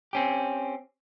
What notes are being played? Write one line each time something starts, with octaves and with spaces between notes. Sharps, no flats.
C4 C#4 G4